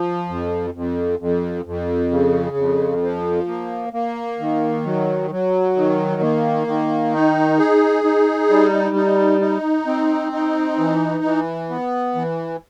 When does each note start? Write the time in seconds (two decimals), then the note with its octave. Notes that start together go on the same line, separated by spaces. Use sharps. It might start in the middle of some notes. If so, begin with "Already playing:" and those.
Already playing: F3
0.29 F2
0.74 F2
1.19 F2
1.65 F2
2.11 C#3
2.57 F2
3.02 F3
3.48 A#3
3.93 A#3
4.39 D#3
4.85 F#3
5.30 F#3
5.76 D#3
6.22 A#3
6.67 D#3
7.13 D#4
7.59 G#4
8.04 D#4
8.50 G3
8.96 D#4
9.41 D#4
9.87 C4
10.32 D#4
10.78 E3
11.24 E3
11.70 B3
12.15 E3